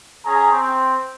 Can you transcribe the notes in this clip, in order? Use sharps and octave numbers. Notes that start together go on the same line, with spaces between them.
C#4 G#4 A#5
C4